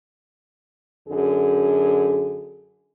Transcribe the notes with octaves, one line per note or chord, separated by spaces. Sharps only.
F#2 D3 G#4